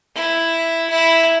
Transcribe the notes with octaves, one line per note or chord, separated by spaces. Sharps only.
E4
E4